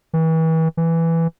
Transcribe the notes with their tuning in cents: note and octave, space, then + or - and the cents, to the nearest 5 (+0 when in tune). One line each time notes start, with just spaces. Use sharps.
E3 -35
E3 +5